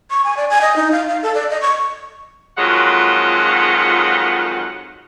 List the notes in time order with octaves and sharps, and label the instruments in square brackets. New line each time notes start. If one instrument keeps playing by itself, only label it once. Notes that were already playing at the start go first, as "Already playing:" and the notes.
[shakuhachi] C#6
G#5
D5
G#5
D#5
D#4
F5
F5
A4
D5
D#5
C#6
[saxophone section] F2 D#3 F#3 G#3 F4 F#5